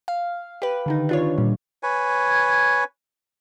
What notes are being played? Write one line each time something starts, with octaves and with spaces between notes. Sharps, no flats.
F5
G4 B4
D3 D#3 D#4
D4 F4 C#5
A#2 G3
B4 C#5 G#5